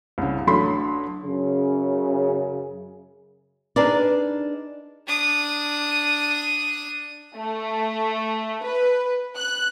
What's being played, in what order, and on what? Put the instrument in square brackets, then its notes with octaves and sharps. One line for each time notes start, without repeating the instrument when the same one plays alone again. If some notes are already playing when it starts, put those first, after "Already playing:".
[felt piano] C2 C#3
A1 F#3 D4 A4 B5 C6
[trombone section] F#2 C#3
[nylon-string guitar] D4 D#4 G#4 A#4 B4 D5
[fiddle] D4 D#6
[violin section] A3
B4
F#6